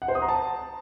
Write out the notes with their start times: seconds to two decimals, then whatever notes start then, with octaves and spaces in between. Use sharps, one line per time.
0.02 F#5
0.08 C5
0.15 D#6
0.22 A#5
0.29 A5